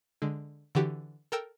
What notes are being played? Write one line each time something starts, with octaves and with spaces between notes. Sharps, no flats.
D3 G#3
D3 E3 F#4 G4
A4 A#4 G5 E6